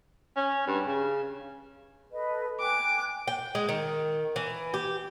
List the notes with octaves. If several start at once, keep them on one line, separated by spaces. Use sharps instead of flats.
C#4
G2
C#3
A4 B4 D#5
G5 G#5 D6 F#6
G5
G#3
D#3
E3
G4